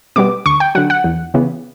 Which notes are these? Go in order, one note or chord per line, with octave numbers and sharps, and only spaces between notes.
B2 G3 B3 D6
D2 C#6
G5
D3 F#3 F#5
F#5
E2
C#3 E3 B3